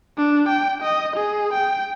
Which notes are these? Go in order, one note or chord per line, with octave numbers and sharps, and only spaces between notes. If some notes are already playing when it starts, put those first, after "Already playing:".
D4
G5
D#5
G#4
G5